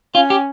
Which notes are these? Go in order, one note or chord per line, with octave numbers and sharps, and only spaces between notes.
C#4 F4
G4